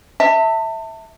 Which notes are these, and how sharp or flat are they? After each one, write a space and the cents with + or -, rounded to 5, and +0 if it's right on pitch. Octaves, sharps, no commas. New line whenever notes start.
E5 -15 A5 +35